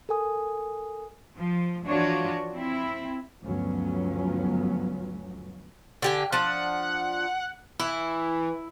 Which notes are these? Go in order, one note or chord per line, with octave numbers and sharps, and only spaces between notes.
A4 A#4 G#5 D#6
F3
E3 F3 D4 F4 F#4 C#5
C4 E4
D2 G2 F3 F#3 B3 C#4
D3 G4 G#5
F3 D4 F#5
E3 E4